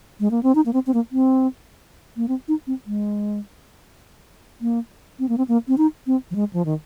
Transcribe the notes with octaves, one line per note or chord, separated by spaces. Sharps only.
G#3
A#3
C4
D#4
A#3
C4
C4
A#3
C4
A#3
C4
D#4
C4
G#3
A#3
C4
A#3
C4
A#3
C4
D#4
C4
F3
G#3
F3
D#3